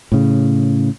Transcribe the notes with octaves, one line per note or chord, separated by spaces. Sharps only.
A2 C#3